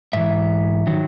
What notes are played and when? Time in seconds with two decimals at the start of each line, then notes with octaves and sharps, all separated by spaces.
0.13 G#2 E3 E5
0.87 D#3 F#3